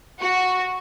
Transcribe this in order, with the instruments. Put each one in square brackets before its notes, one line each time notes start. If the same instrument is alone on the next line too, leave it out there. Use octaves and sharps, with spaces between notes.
[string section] F#4